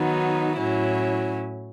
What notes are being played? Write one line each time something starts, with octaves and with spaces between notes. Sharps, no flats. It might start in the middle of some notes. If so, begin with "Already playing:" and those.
Already playing: D#3 F#3 B3 D#4
A2 F#3 C#4 E4